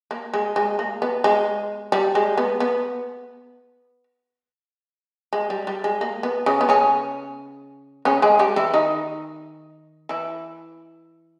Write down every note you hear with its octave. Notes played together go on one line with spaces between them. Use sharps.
A#3
G#3
G#3
A#3
B3
G#3
G3
G#3
B3
B3
G#3
G3
G3
G#3
A#3
B3
C#3 C#4
B3
C#3 C#4
C#3 C#4
G#3 G#4
G3 G4
E3 E4
D#3 D#4
E3 E4